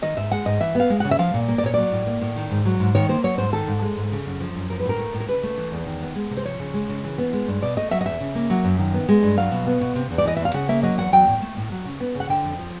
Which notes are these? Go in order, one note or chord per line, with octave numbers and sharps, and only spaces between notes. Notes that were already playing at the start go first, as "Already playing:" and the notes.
D#3 D#5
G#2 E5
G#3 F#5
G#2 D#5
E3 E5
B3 F5
G#3
C#3 F#5
E5
F3 F5
A#2
A#3
D5
A#2 C#5
F#3 D5
A2
A#3
A2
D#3
G#2
F#3
G#2
D#3 C#5
A#3 C5
F#3 C#5
G#2 C5
D#3 A4
G#2
G#3
G#2
C#3
F#2
F3
F#2
F3 A#4
B4
A2 A#4
A3
A2
A#4
C#3 B4
A3
E3
E2
D#3
B3
G#3
C3
C5
F3 C#5
C#3
G#3
C#3
E3
B3
G#3
G2
B2 D5
A3 D#5
F#3 E5
D#5
E2 E5
C#3
A#3
F#3
F#2
D#3
B3
G#3
G2
F#3 F5
B2
B3
B2
C3
E2
D5
E3 D#5
E2 E5
F5
C#3 F#5
A#3 E5
F#3 D#5
E2 F#5
F#3 G5
A2
A3
A2
F#3
C#3
B3
C#3
F#5
D3 G5
F2
F3